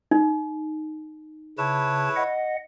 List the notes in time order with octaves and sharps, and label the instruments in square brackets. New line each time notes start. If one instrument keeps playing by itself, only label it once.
[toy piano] D#4
[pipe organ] C#3 A5 [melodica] E4 B4 C#5
[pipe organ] D#5 F#5